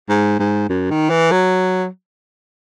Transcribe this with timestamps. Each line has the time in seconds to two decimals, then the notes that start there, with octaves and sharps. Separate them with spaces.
0.09 G#2
0.39 G#2
0.69 F#2
0.90 D#3
1.10 E3
1.31 F#3